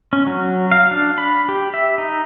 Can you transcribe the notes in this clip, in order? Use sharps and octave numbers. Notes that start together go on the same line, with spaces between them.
C#4
F#3
F5
D4
B5
G4
E5
D#4